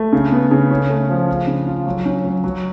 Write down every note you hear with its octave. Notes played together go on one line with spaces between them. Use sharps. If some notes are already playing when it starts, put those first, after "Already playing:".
Already playing: A3
C#3
B3
C#3
C#4
A3
F3
F4
C#3
F4
F#3
C#4
F#3
F#3